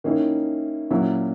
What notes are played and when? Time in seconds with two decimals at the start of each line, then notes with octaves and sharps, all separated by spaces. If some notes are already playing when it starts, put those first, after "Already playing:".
0.04 D#3 A#3 C#4 E4
0.91 A#2 F#3 C#4 E4